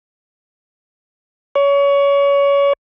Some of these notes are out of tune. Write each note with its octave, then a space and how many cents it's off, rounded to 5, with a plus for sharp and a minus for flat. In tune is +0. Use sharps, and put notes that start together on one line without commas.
C#5 +25